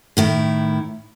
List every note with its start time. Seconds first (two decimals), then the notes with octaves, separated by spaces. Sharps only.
0.17 A2 D#3 E4